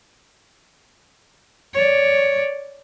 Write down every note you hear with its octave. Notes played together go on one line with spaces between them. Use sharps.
C#5 D5